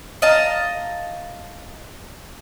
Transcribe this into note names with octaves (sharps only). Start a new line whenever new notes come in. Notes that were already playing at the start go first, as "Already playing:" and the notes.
D#5 F5 A5 A#5